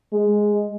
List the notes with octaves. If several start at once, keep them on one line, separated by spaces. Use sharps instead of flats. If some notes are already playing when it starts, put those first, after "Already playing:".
G#3